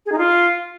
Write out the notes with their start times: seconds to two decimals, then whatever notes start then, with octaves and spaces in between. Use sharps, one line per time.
0.06 G#4
0.12 D#4
0.18 F4